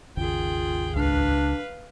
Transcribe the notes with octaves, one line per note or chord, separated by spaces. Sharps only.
G#1 D#2 C#3 F4 G#4 G5
C#2 D4 B4 F5